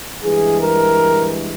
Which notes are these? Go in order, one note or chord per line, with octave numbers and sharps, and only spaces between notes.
G2 E3 G#3 G#4
A#4